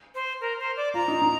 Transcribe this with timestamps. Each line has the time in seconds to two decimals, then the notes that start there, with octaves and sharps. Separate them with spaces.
0.15 C5
0.41 A#4
0.59 C5
0.77 D5
0.94 F4 A#5
1.08 D#4
1.22 D#4